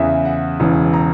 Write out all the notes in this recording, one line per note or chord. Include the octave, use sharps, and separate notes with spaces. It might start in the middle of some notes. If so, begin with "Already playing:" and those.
Already playing: E2 C#3 E3 E5
F#5
E1 E2 C#3
A#5